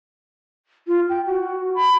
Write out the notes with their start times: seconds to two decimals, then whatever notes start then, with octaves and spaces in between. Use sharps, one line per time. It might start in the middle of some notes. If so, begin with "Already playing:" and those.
0.87 F4
1.09 G5
1.26 F#4
1.75 B5